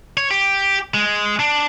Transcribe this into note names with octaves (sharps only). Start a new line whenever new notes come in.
C#5
G4
G#3
D4